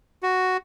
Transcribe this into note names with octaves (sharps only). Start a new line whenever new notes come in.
F#4